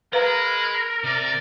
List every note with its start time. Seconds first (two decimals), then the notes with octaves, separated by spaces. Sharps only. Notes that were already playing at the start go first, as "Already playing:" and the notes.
0.13 G#3 A#4 B4 F5 A#5 B5
1.04 C3 D5